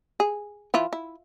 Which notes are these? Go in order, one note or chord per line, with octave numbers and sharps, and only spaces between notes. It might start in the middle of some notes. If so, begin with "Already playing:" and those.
G#4
E3 E4 F4
E4